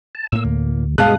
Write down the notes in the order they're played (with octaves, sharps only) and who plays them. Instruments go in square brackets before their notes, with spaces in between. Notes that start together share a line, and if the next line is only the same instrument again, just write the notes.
[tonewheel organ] A5
[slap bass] A2 A#3 [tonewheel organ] E6
[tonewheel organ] D2
[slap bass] D2 G2 B2 [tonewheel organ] G#3 D#6 [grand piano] F5 A5 F#6